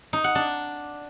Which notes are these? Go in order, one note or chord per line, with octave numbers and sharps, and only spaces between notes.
D#4
F#5
D4